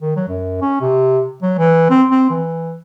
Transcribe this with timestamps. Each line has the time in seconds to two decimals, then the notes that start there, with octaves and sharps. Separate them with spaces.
0.02 D#3
0.16 F#3
0.28 F#2
0.61 C#4
0.81 C3
1.42 F#3
1.58 E3
1.90 C4
2.10 C4
2.30 E3